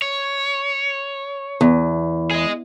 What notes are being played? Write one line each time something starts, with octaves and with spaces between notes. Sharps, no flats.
C#5
E2
G#4 D#5